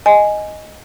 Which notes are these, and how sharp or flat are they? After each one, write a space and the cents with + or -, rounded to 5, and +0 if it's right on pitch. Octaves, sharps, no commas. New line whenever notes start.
D#5 +0 G#5 +0